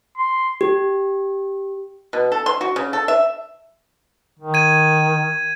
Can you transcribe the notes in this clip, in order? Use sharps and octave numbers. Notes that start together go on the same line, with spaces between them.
C6
G4
B2
A4
C6
F#4
C#3
A4
E5
D#3
G#6 D#7